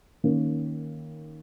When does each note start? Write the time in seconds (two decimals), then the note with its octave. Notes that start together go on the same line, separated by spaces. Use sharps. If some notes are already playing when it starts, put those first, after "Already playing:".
0.24 D#3 A#3 C#4